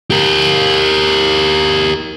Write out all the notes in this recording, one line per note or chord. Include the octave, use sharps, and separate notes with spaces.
G4 A#4